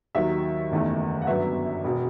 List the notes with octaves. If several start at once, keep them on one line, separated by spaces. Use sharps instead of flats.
D#2 D#3 F#3 E5
F#1 E2 D#3 A3
F#5
G1 F#2 F#3 B3 E5
E1 B2